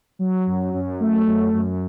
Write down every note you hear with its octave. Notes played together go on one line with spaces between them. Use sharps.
F#3
F#2
F#2
A3
F#2
F#2